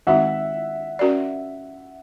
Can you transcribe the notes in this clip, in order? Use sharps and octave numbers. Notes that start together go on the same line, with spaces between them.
D#3 G#3 C4 D#4 F#4 E5 F#5
C#4 F#4 A#4 D5